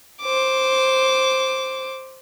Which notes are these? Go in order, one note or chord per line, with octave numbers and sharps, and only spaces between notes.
C5 D6